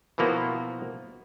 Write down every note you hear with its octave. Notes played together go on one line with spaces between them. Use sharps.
B2 E3 F3 A#3 B3 F#4